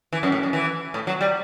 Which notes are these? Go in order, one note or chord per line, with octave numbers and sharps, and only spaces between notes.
E3
F#2
A2
F#2
E3
A2
F#3
G3